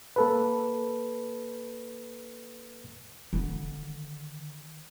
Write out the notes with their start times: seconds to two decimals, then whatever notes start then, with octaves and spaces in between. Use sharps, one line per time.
0.16 A#3 A4 B4
3.33 D3 D#3